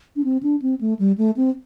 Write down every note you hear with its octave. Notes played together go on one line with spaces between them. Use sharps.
D4
C4
D4
C4
A3
G3
A3
C4